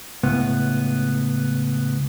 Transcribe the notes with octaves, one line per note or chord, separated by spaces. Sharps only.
C#2 A2 B3